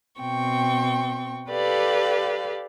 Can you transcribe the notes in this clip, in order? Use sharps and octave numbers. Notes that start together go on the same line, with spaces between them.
B2 C4 G5 C#6
G4 A4 B4 D5 F5